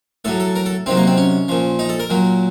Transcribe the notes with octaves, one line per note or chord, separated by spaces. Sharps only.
A2 F#3 A4
A4
A#4
A4
C3 D#3 F#3 C4
A#3
C4
C#4
A#2 F3
D#4
A4
A#4
A#2 F#3